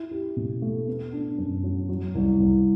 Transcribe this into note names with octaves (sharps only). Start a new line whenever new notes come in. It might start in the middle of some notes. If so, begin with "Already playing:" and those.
Already playing: E4
G4
B2
A3
B3
D4
F#2
F#3
F#3
C2
C2